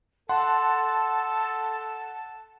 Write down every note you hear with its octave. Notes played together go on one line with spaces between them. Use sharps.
A4 F#5 A5 C6